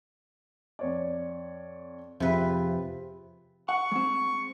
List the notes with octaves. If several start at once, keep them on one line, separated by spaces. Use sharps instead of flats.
F2 C#5 D5
F2 C3 F4 G#4 B4
F#5 C#6
G#3 C4